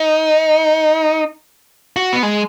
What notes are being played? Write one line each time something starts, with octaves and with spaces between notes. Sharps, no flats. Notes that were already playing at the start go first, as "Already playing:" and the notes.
Already playing: D#4
F#4
B3
G#3